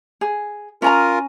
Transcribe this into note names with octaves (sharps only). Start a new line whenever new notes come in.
G#4
C#4 F4 A#4 G#5 A#5